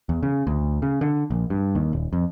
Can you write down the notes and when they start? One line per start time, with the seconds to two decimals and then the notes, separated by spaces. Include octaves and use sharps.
0.09 E2
0.23 C#3
0.47 D2
0.82 C#3
1.01 D3
1.31 A#1
1.50 G2
1.75 D#2
1.93 D#1
2.13 F2